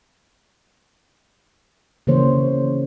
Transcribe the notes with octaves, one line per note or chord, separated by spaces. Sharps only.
C#3 E3 A#3 C5 C#5